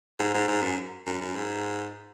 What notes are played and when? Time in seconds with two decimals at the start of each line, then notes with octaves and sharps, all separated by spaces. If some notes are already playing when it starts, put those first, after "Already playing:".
0.19 G#2
0.34 G#2
0.48 G#2
0.62 F#2
1.06 F#2
1.21 F#2
1.35 G#2